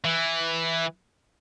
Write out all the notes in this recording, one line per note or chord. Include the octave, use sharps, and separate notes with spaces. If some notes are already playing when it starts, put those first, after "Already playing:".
E3